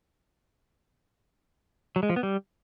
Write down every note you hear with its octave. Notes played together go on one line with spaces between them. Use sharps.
F#3
G#3
F3
B3
G3